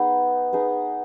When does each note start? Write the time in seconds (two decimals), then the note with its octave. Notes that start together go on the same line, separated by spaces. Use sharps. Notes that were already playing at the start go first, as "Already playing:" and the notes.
Already playing: B3 D#4 G#4
0.53 B3 D#4 G#4